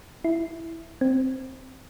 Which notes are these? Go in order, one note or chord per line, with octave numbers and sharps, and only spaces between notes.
E4
C4